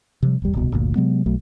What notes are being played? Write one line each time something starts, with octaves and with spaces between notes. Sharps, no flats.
C3 F3 G3
F1 D#2 G3
D1 C2 B2
G1 D2 A#2 A#3
C3 F#3 G#3 B3
B1 F#3 A3